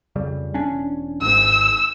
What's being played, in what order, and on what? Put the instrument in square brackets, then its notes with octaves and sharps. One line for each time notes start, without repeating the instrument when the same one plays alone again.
[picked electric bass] F2 C#3 G3
E1 C#4 D4
[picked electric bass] G#1 G#2 [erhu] E6